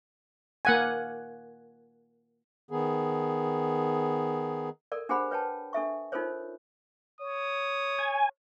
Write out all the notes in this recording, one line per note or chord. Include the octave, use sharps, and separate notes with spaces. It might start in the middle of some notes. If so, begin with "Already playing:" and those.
A#3 F#5 G#5
D#3 B3 G#4
A4 A#4 D5
D4 G4 G#4 C5 F#5 B5
B4 C#5 G5 A5
D4 A4 E5 C#6
D#4 F4 A4 A#4 C5 C#5
C#5 D#6
G#5